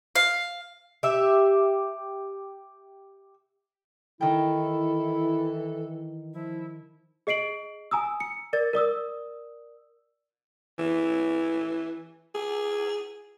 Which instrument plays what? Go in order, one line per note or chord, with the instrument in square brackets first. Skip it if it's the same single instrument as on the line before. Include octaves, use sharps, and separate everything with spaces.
[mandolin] F5
[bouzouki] G4 E5
[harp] D#3 G5 [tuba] E3 [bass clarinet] E4 [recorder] A4
[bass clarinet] F3 [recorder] E4
[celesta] G#4 D#5 C7 D7 F#7
G#5 A#5 D#6 E6
C#7
A#4 D5 A6
A#4 D5 D#6 E6
[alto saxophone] E3
G#4